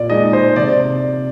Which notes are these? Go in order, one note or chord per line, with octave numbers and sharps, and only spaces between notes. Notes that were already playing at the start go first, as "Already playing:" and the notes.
Already playing: A#2 D5
G#3 D#4 D#5
C5
C3 D5